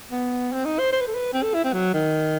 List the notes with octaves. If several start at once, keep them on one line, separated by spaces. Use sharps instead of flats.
B3
C4
D#4
C5
C5
B4
A4
B4
C4
A4
E4
C4
F#3
D#3